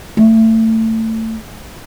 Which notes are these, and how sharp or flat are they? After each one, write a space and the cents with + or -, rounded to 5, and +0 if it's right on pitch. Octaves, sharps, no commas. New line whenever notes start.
A3 +25